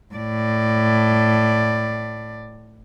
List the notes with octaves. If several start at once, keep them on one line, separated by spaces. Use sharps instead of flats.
A2 D5